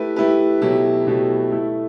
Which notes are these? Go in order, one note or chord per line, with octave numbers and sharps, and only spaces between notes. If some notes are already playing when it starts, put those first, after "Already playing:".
Already playing: A3 E4 G4 B4
A3 E4 G4 B4
B2 F#3 A3 E4 G4
B2 F#3 A3 E4 G4
A3 E4 A4